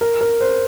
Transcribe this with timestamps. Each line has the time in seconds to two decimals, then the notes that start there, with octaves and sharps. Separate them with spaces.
0.01 A#4
0.21 A#4
0.40 C5